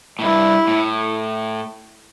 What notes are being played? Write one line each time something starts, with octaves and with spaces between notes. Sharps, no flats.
A2
G2 E4
A2